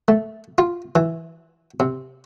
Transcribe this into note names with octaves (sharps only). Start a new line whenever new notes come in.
A3
F4
E3
C3